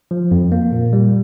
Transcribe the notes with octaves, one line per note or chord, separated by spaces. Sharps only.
F3
F2
A#3
A#2
G3